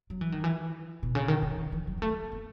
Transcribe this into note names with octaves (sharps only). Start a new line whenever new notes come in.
F#3
E3
D#3
E3
B2
C#3
D#3
C#3
D#3
E3
F#3
G#3
A3
B3